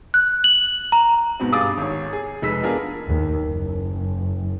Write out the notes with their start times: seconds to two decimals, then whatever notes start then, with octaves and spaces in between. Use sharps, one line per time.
0.14 F#6
0.44 F#7
0.92 A#5
1.40 G#2 B2 B3 C4
1.52 G2 G#4 F5 D6 D#6 A6
1.78 G#1 C#5
2.13 G#4
2.42 F1 G#3 B4 E6 B6
2.63 B3 D4 F4 G#4 A#4
3.08 D#2
3.45 F#1